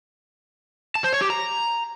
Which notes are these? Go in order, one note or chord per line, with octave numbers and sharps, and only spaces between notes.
A5
C5
C#5
G4
A#5